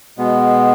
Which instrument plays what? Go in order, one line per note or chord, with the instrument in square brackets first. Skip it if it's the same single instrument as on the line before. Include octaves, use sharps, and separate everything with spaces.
[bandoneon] B2 G#3 B3